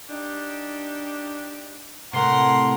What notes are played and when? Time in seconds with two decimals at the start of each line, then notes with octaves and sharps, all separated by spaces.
0.10 D4 D#4 G4
2.13 A2 C3 A#4 F#5 C6